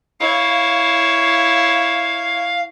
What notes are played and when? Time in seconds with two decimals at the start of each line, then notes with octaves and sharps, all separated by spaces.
0.20 E4 C#5 F5